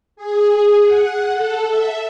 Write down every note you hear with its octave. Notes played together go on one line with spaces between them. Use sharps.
G#4
F#5
A4
E5